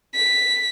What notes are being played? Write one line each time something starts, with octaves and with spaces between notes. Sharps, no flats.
B6